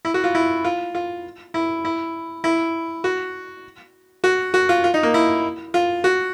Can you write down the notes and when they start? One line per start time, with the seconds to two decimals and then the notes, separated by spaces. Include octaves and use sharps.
0.05 E4
0.14 F#4
0.24 F4
0.35 E4
0.65 F4
0.95 F4
1.54 E4
1.85 E4
2.44 E4
3.04 F#4
4.24 F#4
4.54 F#4
4.69 F4
4.84 F4
4.94 D#4
5.03 A#3
5.14 E4
5.74 F4
6.04 F#4